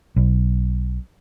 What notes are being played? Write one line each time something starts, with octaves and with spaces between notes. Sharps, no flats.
B1